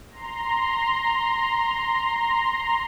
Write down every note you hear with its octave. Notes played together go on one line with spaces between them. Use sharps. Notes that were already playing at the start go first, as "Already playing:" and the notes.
A#5 C6